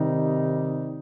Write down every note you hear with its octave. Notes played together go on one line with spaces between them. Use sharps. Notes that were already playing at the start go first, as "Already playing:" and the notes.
Already playing: C3 D#3 G3 D#4